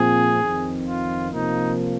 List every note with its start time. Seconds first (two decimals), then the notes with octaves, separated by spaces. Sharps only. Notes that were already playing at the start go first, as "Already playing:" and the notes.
Already playing: A#2 F3 C4 G#4
0.41 F2 D#3 C4
0.86 F4
1.32 C3 F3 A#3 D#4